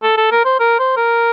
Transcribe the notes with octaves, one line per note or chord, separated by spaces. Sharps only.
A4
A4
A#4
C5
A#4
C5
A#4